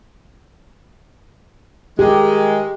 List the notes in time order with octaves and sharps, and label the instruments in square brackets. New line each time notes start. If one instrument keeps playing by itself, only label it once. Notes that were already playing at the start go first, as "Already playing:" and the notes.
[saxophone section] D#3 G#3 [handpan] G4